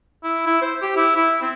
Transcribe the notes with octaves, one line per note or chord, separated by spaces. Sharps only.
E4
E4
C5
G4
E4
E4
C4